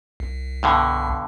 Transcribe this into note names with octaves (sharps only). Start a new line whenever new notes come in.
C2
G2 B2 D3